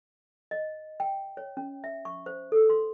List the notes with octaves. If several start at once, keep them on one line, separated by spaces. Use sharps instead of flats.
D#5
G5
C#5
C#4
E5
C#6
C5
A4
C6